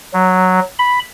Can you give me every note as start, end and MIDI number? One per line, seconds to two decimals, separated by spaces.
0.13 0.60 54
0.79 0.99 83